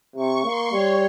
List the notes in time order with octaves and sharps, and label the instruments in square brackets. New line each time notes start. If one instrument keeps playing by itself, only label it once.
[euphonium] C3 [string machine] C#6
[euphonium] A#3 [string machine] C6
[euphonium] G3 [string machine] C#5